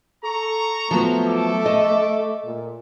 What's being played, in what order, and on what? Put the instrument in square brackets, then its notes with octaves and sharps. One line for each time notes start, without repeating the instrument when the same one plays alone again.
[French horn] A4 [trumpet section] A#5 C#6
[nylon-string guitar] F3 F#3 B3 [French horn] A3
[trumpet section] A4 D6
[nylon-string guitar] D#5
[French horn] A#2